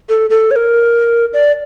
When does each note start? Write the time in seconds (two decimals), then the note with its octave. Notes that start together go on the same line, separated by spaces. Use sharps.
0.09 A4
0.30 A4
0.51 C#5
0.56 A#4
1.33 D5